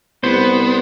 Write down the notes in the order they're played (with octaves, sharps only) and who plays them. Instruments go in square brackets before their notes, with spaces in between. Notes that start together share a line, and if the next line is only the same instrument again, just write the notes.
[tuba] C2 [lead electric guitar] B3 [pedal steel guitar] C5